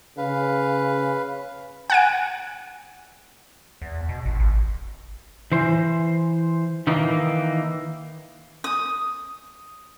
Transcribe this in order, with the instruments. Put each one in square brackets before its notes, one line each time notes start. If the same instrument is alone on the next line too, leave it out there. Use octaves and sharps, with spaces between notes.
[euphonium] C#3 [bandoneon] B4 F5
[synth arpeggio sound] F#5 G#5 D7
[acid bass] E2
B2
A1
G#1
[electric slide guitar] E3 C5
D#3 E3 A#3 D#4
[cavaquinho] D#6